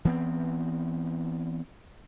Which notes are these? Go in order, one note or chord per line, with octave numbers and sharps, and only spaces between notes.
E3 B3 C4